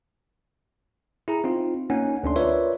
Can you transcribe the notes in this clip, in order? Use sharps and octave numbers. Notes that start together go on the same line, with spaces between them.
E4 G#4 A#5
C4 D#4 F4
A#3 C#4 D#4 F#5 G#5
D2 C#4 D4 C6
F4 A#4 B4 C#5 D5 E5